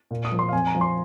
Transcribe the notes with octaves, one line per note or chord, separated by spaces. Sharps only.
A#2
D#6
F3
C6
F5
F2 G#5
A#5
F3
C6